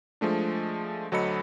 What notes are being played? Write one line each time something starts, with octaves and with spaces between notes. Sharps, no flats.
F3 G#3 A3 D4
D2 F#3 A4 D#5 B5 C#7